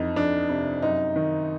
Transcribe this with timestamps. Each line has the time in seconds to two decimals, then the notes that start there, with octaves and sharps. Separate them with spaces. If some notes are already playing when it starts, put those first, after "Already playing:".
Already playing: F2 E3 D#4
0.16 F2 D4
0.49 C3
0.82 F#2 D#4
1.16 D#3